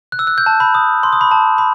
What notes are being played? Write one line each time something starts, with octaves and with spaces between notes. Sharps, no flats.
F#6
E6
F#6
G6
A5
B5
D#6
C6
D#6
B5
A5
B5